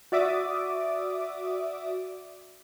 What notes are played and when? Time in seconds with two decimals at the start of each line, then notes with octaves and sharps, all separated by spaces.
0.12 F#4 D5 E5 D6 D#6